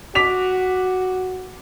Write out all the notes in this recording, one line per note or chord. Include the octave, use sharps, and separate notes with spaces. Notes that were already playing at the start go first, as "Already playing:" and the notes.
F#4 D6 B6 F7